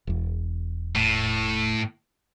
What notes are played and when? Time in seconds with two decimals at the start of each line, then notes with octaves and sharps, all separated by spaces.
0.07 E1 E2
0.95 A2